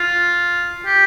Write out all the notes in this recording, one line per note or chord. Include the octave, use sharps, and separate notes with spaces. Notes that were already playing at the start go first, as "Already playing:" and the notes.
Already playing: F4
G4